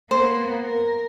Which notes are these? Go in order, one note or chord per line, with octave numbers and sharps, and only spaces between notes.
A#3 B3 C5
A#4